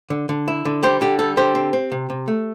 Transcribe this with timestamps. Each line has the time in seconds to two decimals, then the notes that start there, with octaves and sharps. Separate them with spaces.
0.10 D3
0.29 D3
0.48 E4
0.65 D3
0.83 G3 G4 C5
1.01 D3 G4
1.19 G3 A4
1.37 D3 G4 C5
1.55 C4
1.73 C4
1.92 C3
2.10 C3
2.28 A3